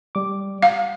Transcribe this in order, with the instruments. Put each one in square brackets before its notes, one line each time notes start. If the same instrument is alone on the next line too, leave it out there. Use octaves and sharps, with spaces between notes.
[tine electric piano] G3 D6
[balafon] F5 [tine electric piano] F#5